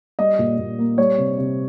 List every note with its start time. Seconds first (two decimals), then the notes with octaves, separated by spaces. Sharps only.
0.19 G3 D#5
0.39 A#2
0.58 A#2
0.79 A#3
0.98 G3 C#5
1.18 C3
1.38 C3